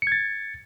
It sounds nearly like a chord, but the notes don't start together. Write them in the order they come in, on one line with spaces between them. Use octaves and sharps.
C#7 G#6 A6